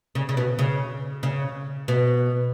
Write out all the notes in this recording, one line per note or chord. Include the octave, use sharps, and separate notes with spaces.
C#3
C#3
B2
C#3
C#3
B2